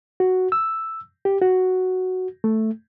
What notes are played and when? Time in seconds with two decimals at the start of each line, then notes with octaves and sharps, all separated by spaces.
0.20 F#4
0.52 E6
1.25 G4
1.42 F#4
2.44 A3